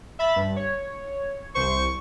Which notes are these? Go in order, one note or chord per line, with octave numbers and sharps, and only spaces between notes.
E5 B5 A6
G2
C#5
C2 C5 C#6